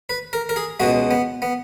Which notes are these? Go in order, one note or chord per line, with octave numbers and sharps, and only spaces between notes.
B4
A#4
A#4
G#4
C#2 B2 G#3 F#4
B3
B3